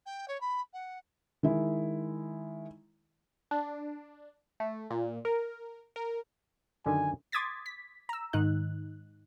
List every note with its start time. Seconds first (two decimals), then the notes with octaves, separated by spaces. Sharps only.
0.06 G5
0.28 C#5
0.41 B5
0.73 F#5
1.43 D#3 G#3 E4
3.51 D4
4.60 A3
4.91 A#2
5.25 A#4
5.96 A#4
6.86 F#2 D3 D#3 G#5
7.32 C6 D6 D#6 G#6 A6 B6
7.66 B6
8.09 A#5 E6
8.33 G#2 D#3 D#4 F#6